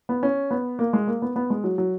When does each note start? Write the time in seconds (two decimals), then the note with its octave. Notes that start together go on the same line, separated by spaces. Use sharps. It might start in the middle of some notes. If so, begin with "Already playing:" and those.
0.09 B3
0.23 C#4
0.51 B3
0.79 A#3
0.93 G#3
1.07 A#3
1.22 B3
1.36 B3
1.50 G#3
1.64 F#3
1.78 F#3